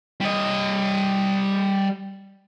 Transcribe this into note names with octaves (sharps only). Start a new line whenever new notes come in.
G3 D#5